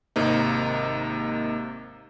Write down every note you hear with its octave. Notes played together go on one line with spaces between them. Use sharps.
G#1 C3 A#3 D#4